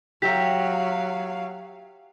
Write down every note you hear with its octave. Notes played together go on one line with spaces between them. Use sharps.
F#3 G4 E5 F5 A#5 B6